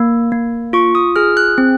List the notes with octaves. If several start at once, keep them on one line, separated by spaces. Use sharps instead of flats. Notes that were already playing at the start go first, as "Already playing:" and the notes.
Already playing: A#3
A#3
F4 C#6
D#6
G#4 F6
F#6
C4